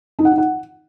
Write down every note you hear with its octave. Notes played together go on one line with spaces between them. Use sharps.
D#4
F#5
D#4
F#5